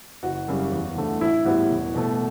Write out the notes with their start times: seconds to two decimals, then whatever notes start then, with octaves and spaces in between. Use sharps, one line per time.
0.23 F#1 F#4
0.48 F#2 C#3 G3
0.72 E2
0.96 D3 A3
1.21 A1 E4
1.45 A2 G3 B3 F#4
1.70 E1
1.94 E2 B2 A3